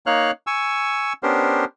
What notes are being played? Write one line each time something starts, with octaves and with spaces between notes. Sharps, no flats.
A#3 D#4 C#5 F5 F6 F#6
G#5 C#6 E6
B3 C#4 D4 G4 A#4 C5